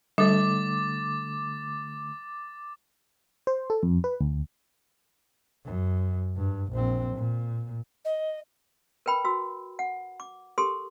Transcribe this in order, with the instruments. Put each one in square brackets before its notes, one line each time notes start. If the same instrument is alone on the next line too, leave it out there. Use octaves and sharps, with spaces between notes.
[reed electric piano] D3 A3 [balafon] G3 [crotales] D6 A6
[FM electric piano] C5
A4
F2
B4
D2
[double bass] F#2
G2
A#1 C4
A#2
[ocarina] D#5
[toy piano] A#4 B4 G5 B5
F#4 E6
F#5
D6
G4 A4 A#4 C6 D#6